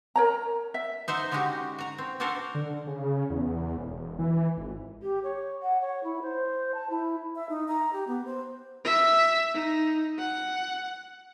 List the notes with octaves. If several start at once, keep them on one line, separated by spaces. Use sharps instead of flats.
A#4 C#5 A#5
E5
D#4 C5 E5 F#5
D3 G#3 C#4 D#4 F#4 G4
F#4 A#5
C4
C4 D4 F#4 A4 A#4 C5
D3
C#3
E2
E1
E3
G#1
G4
C#5
F#5
C#5
E4
C5
A5
E4
E5
D#4
A#5
G4
B3
C5
E5
D#4
F#5